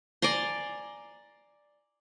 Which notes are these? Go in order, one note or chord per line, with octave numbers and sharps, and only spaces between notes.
D5 G#5 A#5 C6